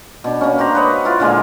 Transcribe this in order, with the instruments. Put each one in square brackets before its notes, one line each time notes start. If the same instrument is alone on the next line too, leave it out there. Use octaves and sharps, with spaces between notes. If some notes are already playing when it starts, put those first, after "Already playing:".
[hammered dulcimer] B2 D4
A#3 C#4
D4 F#4 C5 A#5
B4 C#5 D#5
E4 F4 C6
A#2 D3 G#3 A#3